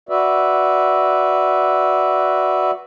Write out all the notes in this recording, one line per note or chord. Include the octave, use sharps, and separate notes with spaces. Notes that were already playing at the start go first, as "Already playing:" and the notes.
F#4 B4 D5 E5